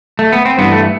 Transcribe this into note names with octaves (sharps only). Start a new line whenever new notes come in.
A3
B3
C4
G2 E3 B3
A3